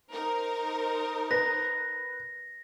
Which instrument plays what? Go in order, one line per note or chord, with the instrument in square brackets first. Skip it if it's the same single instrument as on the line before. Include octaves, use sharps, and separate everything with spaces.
[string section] D#4 A#4 C5
[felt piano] B4 [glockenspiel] A#6